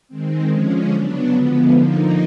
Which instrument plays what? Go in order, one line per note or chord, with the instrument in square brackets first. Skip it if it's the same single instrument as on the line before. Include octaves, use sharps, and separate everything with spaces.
[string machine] D#3 G#3 C4
D3 F3 G#3 C#4
C#3 F#3 B3 D4
D3 F3 G#3 B3
D3 F3 A#3 D#4